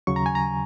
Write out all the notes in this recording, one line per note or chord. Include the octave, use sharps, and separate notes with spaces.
D#2 C#3 F#3 C#6
A#5
G#5
A#5